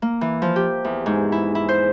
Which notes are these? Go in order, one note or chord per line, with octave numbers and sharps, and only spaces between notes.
A#3
E3
F3
G4
E2
G#2
E4
E4
C5